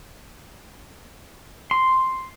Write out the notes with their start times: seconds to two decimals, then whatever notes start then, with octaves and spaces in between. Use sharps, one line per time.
1.71 C6